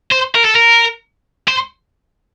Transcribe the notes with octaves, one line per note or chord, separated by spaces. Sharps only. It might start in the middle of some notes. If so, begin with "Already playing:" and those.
C5
A#4
A4
A#4
C5